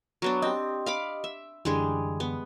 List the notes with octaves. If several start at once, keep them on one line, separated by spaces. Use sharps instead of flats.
F#3 B3 D4
C4 G4 D#5
F5 B5 D6
E5
F#2 D3 E3 G3 G#3 G#4
B3